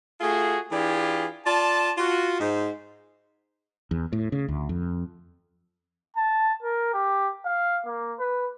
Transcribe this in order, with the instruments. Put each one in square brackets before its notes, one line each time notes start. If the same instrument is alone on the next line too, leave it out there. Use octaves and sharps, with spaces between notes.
[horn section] A3 F4 F#4 G#4
E3 D4 F4 G4 G#4
F4 D5 A5
F4 F#4
G#2 C5
[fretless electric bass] E2
A2
C#3
D2
F2
[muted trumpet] A5
A#4
G4
F5
A#3
B4